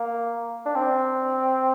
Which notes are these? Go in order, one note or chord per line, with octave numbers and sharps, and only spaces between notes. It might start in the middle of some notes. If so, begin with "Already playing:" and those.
Already playing: A#3
D4
C4